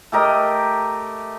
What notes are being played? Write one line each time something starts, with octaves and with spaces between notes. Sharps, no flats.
A3 G4 A#4 D#5